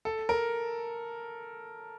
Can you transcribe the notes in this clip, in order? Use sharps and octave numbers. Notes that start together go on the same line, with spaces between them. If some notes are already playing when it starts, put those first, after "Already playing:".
A4
A#4